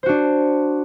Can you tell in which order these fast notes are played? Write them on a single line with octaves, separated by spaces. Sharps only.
C5 F#4 D4